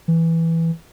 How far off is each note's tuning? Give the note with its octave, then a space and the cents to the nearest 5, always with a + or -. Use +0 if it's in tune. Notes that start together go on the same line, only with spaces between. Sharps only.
E3 +0